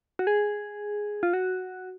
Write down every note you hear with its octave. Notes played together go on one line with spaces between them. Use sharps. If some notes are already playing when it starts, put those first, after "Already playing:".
F#4
G#4
F4
F#4